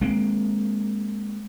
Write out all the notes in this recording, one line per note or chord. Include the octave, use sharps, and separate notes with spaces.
G#3 A#3 C4